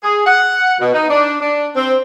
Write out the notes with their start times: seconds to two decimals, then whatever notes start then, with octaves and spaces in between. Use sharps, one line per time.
0.03 G#4
0.27 F#5
0.79 B2
0.94 D#4
1.09 D4
1.40 D4
1.76 C4